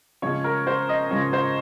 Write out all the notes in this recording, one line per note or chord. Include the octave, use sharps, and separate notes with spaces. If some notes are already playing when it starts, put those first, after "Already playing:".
C#3 F3 G#3 C#4 C#5
A#4
C5
D#5
C#3 F3 G#3 C#4 C#5
C5